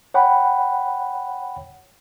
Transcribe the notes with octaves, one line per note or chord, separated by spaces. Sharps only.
C#5 F#5 G5 B5